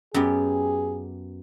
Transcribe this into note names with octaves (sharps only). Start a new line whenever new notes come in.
F#2 B3 G4 G#4